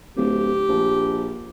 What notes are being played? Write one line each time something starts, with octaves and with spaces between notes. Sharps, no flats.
D1 G4
A#1